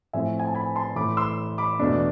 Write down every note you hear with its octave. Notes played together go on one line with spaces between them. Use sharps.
A2 F3 A3 C4 E4 E5 G#5
G#5
A5
G#5 B5
A5 C6
A2 E3 A3 B5 D6
C6 E6
B5 D6
E2 B2 A3 D4